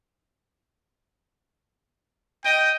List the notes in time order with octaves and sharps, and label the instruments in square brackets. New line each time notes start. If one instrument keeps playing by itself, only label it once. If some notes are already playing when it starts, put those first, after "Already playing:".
[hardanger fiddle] D#5 [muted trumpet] G5